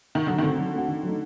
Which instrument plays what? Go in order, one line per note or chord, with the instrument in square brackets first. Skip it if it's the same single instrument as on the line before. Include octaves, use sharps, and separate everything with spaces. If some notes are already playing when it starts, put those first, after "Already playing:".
[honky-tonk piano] D#3
[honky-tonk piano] D3 [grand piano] F#3
[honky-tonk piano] D#3
[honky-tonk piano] D3 [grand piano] A3 C4 F#4
[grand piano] F#3
A3 C4 F#4
D#3
F#3 A3 D#4